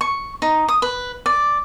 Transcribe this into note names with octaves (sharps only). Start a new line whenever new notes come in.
C#6
D#4
D#6
B4
D5